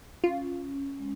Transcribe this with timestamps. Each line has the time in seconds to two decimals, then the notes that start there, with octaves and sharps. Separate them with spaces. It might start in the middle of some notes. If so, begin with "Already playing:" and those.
0.24 C#4 F4
0.48 C#4
0.74 C#4
0.99 G#3